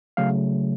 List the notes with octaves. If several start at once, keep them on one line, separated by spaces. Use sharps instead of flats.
C#3 F#3 A3 F5